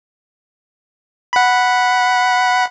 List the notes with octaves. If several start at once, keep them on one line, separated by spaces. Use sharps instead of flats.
F#5 B5